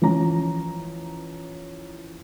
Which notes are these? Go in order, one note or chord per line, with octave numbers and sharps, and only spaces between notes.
E3 F3 C#4 A#5